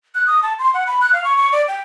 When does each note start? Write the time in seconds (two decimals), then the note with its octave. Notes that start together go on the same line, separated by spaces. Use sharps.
0.15 F#6
0.27 D#6
0.43 A5
0.59 C6
0.74 F#5
0.87 B5
1.01 F#6
1.13 F5
1.24 C#6
1.37 C#6
1.52 D5
1.68 G5